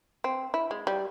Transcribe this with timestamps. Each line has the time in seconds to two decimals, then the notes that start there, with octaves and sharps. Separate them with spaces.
0.24 C4
0.54 E4
0.71 G#3
0.87 G3